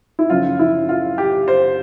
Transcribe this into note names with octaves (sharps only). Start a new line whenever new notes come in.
E4
F#2 C#3 F3 F4
E4
F4
G4
C5